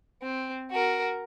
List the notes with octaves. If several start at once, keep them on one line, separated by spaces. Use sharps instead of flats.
C4
F#4 A#4